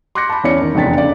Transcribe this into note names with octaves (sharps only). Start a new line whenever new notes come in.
C6 D6 F#6 G6 A#6 C#7
A5 B5
E2 C#4 D5 C#7
D#3
F1 E2 D4 G5 A6 B6
C#3 D5